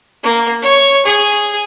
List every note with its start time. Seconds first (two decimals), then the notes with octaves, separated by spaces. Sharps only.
0.23 A#3
0.62 C#5
1.05 G#4